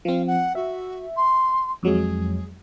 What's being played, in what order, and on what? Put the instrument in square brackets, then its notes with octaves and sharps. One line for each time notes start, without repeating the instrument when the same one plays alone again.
[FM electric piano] F3 C4 [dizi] F5
[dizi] F#5
[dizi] F#4 [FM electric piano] E5
[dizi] C6
[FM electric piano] F2 F#3 G#3 [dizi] G#4